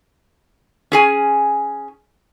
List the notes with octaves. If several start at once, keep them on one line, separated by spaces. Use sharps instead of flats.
C#4 G#4 G#5